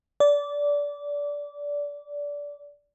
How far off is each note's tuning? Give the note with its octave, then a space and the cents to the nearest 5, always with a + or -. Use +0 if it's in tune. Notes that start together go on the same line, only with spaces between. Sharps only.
D5 -20